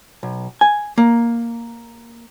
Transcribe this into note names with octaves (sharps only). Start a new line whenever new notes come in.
B1
G#5
A#3